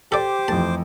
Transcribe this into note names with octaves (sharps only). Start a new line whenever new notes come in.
G4 A4 C5 D5 D6
F2 E3 A3 A5